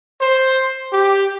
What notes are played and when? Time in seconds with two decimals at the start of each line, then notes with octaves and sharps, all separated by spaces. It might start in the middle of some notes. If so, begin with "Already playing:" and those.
0.21 C5
0.93 G4